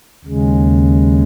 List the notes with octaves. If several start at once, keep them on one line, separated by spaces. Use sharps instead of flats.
D#2 C#3 G#3